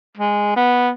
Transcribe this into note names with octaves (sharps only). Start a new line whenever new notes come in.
G#3
B3